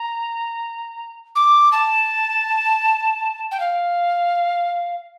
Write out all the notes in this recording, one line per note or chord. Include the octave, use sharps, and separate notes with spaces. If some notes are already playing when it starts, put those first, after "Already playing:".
Already playing: A#5
D6
A5
G5
F5